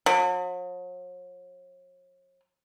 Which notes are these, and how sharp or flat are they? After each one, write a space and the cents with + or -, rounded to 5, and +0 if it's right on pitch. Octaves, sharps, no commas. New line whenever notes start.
F#3 -45